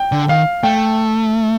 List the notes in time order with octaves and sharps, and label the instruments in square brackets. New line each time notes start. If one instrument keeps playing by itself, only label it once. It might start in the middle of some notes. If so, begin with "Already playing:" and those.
Already playing: [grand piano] G5
[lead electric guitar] D3
[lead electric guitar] D#3 [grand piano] F5
[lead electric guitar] A3 [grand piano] G5